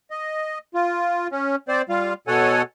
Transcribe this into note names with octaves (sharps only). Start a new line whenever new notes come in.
D#5
F4
C#4
C4 C5 D5
G3 F4 F5
B2 A4 C#5 F#5 G#5